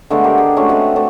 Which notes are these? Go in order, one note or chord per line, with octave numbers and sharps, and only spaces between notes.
D3 G#3 A3 B3
G4 A#4
G#4
G#3 A3 C#4 F#4
A3 C4 B4 F#5
A3 D4